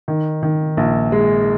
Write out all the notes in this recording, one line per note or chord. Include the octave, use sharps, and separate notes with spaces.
D#3
D#3
A#1
G#3